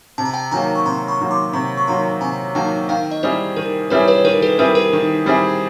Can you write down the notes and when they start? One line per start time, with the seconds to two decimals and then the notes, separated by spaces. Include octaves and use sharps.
0.18 C3 A5
0.25 A#5
0.34 G5 A5
0.51 D#3 F#3 A#3 G#5 A#5
0.75 C#6
0.86 C3 A#5 C6
1.08 B5 C#6
1.20 D#3 F#3 A#3
1.31 C6 D6
1.53 C3 B5 C#6
1.77 C#6
1.87 D#3 F#3 A#3 A#5 C6
2.21 C3 G#5 A#5
2.55 D#3 F#3 A#3 G5 A5
2.89 D#3 F5 G5
3.11 D#5
3.23 G3 C4 E4 G#4 C5 D5
3.56 D#3 A#4
3.90 G3 C4 E4 G#4 B4 C#5
4.08 B4 C#5
4.25 D#3 A#4
4.42 A4 B4
4.59 G3 C4 E4 G#4 A#4
4.75 A#4
4.93 D#3
5.26 G3 C4 E4 G#4